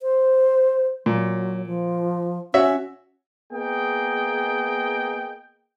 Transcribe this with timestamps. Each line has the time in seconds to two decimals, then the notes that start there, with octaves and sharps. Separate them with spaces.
0.01 C5
1.06 A#2 F#3
1.66 F3
2.54 C#4 F#4 C#5 E5
3.53 A#3 B3 G#4 D#5 G5